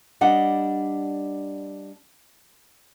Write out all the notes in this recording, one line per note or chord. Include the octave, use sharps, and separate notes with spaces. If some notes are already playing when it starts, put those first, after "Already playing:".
G3 D4 D#5 F#5